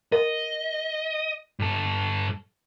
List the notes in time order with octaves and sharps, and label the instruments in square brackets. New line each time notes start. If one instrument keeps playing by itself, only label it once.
[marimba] A#4 [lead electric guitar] D#5
[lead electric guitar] G2 A4